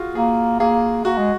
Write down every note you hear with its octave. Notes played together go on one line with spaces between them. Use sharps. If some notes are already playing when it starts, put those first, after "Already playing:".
Already playing: F4 F#4 G#4
A#3 G#4
A#3 G#4
A#3 F#4
G#3